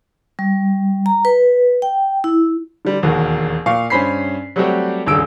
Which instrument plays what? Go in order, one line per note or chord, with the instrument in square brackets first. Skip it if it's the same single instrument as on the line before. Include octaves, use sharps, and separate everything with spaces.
[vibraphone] G3
A#5
B4
G5
E4
[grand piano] D3 G3
E1 D#2 F#4 A#4
A#2 F5 C#6
G2 C#4 C5 B5 B6 C7
F#3 G3 A3 C4 F#4 G4
D#1 C#2 G2 E6 D7